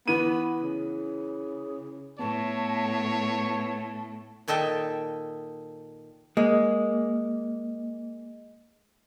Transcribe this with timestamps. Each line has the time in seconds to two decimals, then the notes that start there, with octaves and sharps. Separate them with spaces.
0.08 E3 B3 D#7
0.62 C#3
2.19 A2 B3 C#5 A5
4.48 A#2 D#3 A4 E5 G5
6.37 G#3 A#3